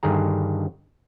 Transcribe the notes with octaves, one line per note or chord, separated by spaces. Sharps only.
G2 D3 D#3 G#4 A#5